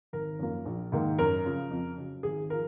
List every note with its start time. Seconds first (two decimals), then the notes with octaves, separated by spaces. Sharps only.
0.13 G#1 A#4
0.39 F#2 F3 A#3
0.65 A#1
0.92 G#2 D#3 A#3
1.19 F#2 A#4
1.45 C#3 F3
1.71 F2
1.97 C#3 F#3
2.23 G#1 G#4
2.50 F3 A#4